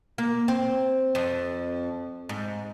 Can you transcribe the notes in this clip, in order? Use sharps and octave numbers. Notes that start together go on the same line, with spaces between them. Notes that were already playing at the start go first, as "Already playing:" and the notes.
A#3
C4
F2
G#2